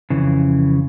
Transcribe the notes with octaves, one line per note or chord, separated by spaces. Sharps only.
F2 C#3 E3